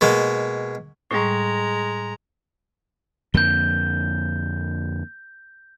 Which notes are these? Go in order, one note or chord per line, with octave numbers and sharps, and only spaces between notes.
B2 G#3 A#3
A2 G3 G#3 A#5
F2 D3 A#3 G6 G7